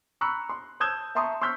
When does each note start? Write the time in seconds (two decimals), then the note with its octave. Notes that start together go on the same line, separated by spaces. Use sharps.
0.21 A#5 B5 C#6 E6 F#6 C#7
0.49 C6
0.80 A5 D#6 E6 G6 G#6 E7
1.15 E5 A5 A#5 C6 C#6 D#6
1.42 C6 C#6 E6 F6 G6 B6